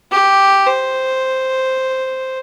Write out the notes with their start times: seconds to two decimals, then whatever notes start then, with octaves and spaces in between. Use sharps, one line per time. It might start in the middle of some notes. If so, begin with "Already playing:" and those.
0.12 G4
0.66 C5